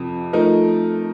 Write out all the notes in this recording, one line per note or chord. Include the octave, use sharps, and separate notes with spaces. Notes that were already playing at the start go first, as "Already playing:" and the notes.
Already playing: F2 C3 F3
F3 A3 D#4 A#4